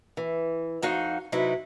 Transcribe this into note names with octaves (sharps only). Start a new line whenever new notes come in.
E3
F2 D#4 F#4 F5
C3 F#3 D#4 E4 B4